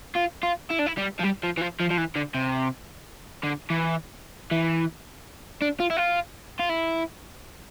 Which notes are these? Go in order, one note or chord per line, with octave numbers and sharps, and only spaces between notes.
F4
F4
E4
D4
E4
G3
F3
G3
F3
E3
F3
F3
F3
E3
D3
C3
D3
E3
E3
D4
F4
E4
F4
F4
E4